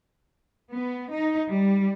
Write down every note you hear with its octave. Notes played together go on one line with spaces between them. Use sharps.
B3
D#4
G3